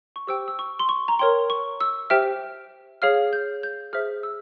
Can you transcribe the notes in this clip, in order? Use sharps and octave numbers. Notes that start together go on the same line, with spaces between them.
C#6
G4 C5 G5 E6
E6
C#6
C6
C#6
A#5
A#4 C#5 G5 C6
C#6
E6
G4 C5 E5 G5 F6
G#4 C#5 F5 F6
G6
G6
G#4 C5 E5 F6
E6